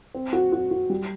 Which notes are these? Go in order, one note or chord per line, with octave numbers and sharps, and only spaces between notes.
C4
F#4
F#4
F#4
G3